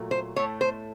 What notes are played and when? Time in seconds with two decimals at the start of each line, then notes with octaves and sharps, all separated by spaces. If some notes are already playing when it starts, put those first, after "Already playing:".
Already playing: A#2 F#3 A3
0.11 C5
0.36 A2 A3 C#5
0.61 C5